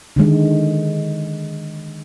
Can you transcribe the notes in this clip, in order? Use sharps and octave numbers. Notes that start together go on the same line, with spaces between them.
D3 D#3 G#3